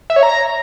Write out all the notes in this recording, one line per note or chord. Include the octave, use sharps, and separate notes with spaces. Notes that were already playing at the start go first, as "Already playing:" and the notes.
E5
C#5
A#5